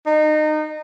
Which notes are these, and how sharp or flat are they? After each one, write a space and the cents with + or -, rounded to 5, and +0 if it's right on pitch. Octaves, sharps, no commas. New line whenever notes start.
D#4 -25